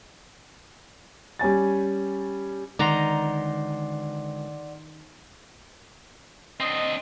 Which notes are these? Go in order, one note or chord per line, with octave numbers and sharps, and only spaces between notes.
G3 C#4 G#5 A6
D3 D#3 G#3 D5 F#5 A#5 C6
C4 D4 D#5